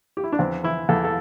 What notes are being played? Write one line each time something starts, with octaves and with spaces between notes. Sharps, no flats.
G4
E4
D4
E2 C4
E3 E4
E2 A4
A4